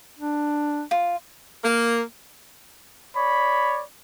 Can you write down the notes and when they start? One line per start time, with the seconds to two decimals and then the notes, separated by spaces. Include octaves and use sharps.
0.19 D4
0.91 F4
1.64 A#3
3.16 C#5 D5 B5